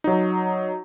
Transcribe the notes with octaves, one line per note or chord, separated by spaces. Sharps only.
F#3 D#4